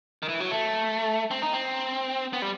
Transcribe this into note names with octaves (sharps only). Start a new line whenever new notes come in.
D#3
E3
F#3
A3
C4
D#4
C4
B3
G3